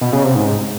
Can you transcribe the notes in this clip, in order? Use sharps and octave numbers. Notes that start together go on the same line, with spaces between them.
B2
C#3
C3
G#2